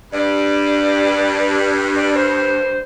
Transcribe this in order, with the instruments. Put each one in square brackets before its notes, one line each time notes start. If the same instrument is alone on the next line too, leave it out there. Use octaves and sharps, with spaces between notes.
[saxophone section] G2 [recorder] D5
[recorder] D5
C5